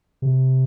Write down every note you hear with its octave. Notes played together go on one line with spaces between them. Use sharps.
C3